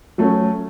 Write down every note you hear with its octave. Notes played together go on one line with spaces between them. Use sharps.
F#3 A3 C#4